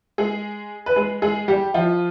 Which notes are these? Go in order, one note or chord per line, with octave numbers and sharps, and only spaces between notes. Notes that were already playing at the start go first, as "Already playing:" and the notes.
G#3 G#4
B4
G#3 G#4
G#3 G#4
G3 G4
F3 F4